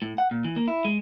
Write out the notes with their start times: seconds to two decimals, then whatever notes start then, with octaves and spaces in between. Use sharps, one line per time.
0.02 A2
0.18 F#5
0.31 A#2
0.45 E3
0.56 A#3
0.68 E4
0.85 G#3